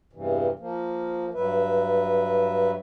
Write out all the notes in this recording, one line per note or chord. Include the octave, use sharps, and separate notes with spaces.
E2 G2 C3 E3
F3 A#3
G2 F#3 B4 E5